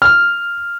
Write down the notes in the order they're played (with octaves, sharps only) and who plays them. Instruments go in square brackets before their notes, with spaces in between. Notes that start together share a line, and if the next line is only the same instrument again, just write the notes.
[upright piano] F6